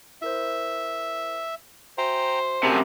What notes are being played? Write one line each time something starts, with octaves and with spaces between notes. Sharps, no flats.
E4 A#4 C5 E5
F#4 C5 E5 G5 G#5 A#5
F#2 C3 G#4 A#4 G#5 A5 B5